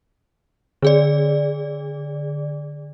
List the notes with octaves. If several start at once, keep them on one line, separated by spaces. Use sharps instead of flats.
D3 G#4 D5